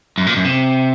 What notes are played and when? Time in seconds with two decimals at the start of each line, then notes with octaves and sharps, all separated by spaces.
0.18 F#2
0.27 A#2
0.36 F#2
0.45 C3